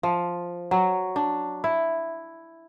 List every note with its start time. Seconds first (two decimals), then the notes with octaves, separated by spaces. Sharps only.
0.03 F3
0.71 F#3
1.16 D4
1.64 E4